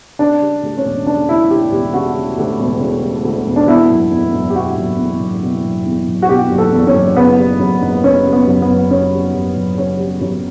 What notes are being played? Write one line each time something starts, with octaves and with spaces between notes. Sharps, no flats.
C#3 D4
G3
D2
C#4
E1
C#3 D4
G3 E4
D2 G4
E1 G4
C#3 F#4
G3
D2
E1
C#3
G3
D2
E1
D4
B2 E4
F#1
E2
F#1
G4
B2 F#4
F#1
E2
F#1
B2
F#1
E2
F#1
F#4
B2 G4
F#1
A4
E2
C#4
F#1
C#3 B3
G3
F#2
F#1
C#3 C#4
G3
B3
F#2
B3
F#1
C#3 C#4
G3
F#2
F#1
C#3 C#4
G3
F#2